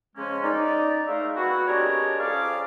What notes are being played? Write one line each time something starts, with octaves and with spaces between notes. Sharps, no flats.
C#3 F3 G#3 A#3 C#4
D#4 D5
G#3 A3 D#4 A#4 E5 F5
B3 C4 E4 F#4
G#3 D4 G4 A#4 C#5 D5
F2 C#4 G#4 D5 F5 D6